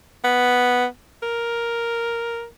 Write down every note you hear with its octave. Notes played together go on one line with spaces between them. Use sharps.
B3
A#4